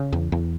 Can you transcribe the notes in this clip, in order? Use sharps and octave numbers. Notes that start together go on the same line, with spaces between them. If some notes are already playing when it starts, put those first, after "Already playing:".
Already playing: C#3
E2
E2